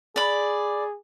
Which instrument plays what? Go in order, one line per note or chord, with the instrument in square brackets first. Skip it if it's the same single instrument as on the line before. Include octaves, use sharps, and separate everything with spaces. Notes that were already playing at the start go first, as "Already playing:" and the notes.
[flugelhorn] G#4 [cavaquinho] D5 B5